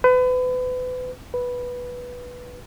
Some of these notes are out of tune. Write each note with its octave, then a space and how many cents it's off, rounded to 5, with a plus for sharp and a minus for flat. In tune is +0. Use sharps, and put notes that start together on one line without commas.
B4 +35
B4 -5